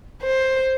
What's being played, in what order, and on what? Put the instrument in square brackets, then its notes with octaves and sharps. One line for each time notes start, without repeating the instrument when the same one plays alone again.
[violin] C5